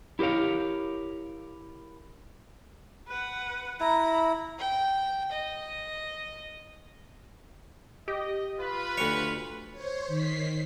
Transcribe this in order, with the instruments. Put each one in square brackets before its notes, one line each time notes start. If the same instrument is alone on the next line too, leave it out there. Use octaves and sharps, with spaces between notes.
[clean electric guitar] E4 G4 A#4 C#5 F5
[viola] B4 F#5
[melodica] E4 [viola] A#5 B5
[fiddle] G5
D#5
[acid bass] G4 [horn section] D#5
[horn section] F4 B4
[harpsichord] D2 C#5
[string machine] C5 C#5
D#3 B6 C7